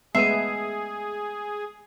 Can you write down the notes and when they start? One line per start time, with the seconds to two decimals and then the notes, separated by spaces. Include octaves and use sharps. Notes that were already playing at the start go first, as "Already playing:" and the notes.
0.15 G#3 A3 B3 G#4 E5 C7 D#7